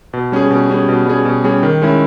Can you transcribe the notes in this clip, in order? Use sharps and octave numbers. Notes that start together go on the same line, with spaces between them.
B2
G3 C#4 G#4
B2
G3 C#4 G#4
B2
G3 C#4 G#4
B2
G3 C#4 G#4
D#3
G#3 C#4 E4